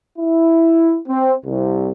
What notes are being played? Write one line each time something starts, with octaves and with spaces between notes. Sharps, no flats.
E4
C4
C2